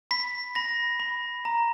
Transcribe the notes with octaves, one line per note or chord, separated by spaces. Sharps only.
B5 B6
B5 A#6
B5
A#5